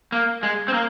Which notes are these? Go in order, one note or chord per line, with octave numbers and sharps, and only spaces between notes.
A#3
G#3
C4
A#3